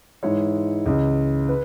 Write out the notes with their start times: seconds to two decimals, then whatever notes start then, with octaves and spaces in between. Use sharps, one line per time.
0.23 G#2 E3 G#3 E4 C#5
0.86 C#2 C#3 E3
1.49 B4